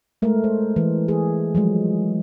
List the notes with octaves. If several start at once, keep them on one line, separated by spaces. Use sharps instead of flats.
G#3 A3 A#4
C5
E3
G#4
F3 F#3 G#3